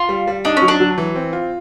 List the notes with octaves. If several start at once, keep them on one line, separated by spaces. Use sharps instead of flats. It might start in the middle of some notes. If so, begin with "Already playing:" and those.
Already playing: F4
G3
G3
D4 D#4
C#4
F#3
D4
F#3
E3
C4
F4